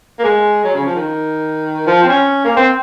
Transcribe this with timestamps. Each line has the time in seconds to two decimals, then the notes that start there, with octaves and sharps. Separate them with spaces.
0.19 A#3
0.24 G#3
0.64 F#3
0.74 C#3
0.85 F3
0.95 D#3
1.87 F3
2.03 C4
2.08 C#4
2.44 A#3
2.56 C4